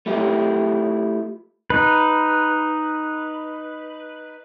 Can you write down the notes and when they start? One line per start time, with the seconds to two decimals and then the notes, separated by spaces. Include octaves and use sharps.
0.06 A3 E4 F4 G4 D#5
1.70 D#4 B4